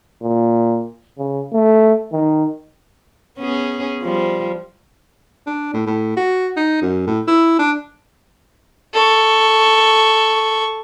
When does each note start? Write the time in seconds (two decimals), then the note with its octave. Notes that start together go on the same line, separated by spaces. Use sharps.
0.22 A#2
1.18 C#3
1.53 A3
2.12 D#3
3.38 B3 C#4 G#4
4.03 F3 G3
5.47 D4
5.74 A2
5.86 A2
6.16 F#4
6.57 D#4
6.81 F#2
7.07 A2
7.27 E4
7.59 D4
8.94 A4 C#6